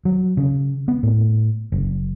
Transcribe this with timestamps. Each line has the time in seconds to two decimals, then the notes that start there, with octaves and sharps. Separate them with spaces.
0.05 F#3
0.37 C#3
0.88 B3
1.03 A2
1.72 F#1